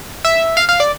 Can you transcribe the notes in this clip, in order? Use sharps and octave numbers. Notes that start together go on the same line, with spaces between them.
E5
F5
F5
D5